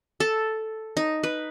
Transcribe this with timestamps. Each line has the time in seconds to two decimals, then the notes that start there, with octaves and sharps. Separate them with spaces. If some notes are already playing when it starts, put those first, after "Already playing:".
0.20 A4
0.97 D#4
1.23 B4